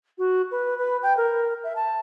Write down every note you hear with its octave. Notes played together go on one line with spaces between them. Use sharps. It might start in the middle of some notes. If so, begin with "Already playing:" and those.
F#4
B4
B4
G5
A#4
E5
A5